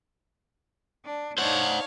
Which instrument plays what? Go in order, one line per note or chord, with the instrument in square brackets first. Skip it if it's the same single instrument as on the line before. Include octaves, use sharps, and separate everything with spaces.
[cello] D4
[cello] D4 D#4 [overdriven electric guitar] C5 F#5 [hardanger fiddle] C#5 F5